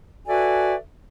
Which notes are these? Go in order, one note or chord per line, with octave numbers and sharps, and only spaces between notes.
F#4 A4 B4 D5 E5 G#5